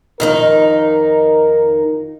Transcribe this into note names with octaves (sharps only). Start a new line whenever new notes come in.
F2 D#3 D#4 A#4